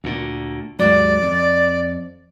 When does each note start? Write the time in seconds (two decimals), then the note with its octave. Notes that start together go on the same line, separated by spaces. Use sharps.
0.04 D2 A#2
0.79 D#2 G#2 F#3 D5
1.22 F2